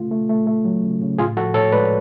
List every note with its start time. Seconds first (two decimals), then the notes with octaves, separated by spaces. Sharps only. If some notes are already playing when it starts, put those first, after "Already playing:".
Already playing: C#3 A3 F4
0.11 A3
0.29 A3
0.47 A3
0.65 F#3
0.83 C#3
1.01 C#3
1.18 A2 F4 G#4
1.37 F3 F#4 A4
1.54 A2 A4 C#5
1.72 G#3 B4 D5